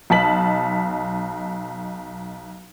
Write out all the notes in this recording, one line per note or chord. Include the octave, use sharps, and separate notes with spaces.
B1 D#5 A5 B6 F#7